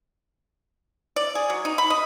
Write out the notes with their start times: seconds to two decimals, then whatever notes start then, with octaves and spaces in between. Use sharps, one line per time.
1.16 D5
1.35 G#4
1.50 F#3
1.65 D#4
1.78 B5
1.90 D#5